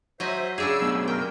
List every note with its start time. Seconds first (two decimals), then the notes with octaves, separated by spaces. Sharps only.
0.20 F#3 C5 D#5 E5
0.58 C#3 D4 G#4 E6
0.81 F#2 B2 B3
1.08 A#4 G5